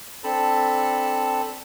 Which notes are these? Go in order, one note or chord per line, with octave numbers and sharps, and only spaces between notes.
C4 D4 A4 A5 B5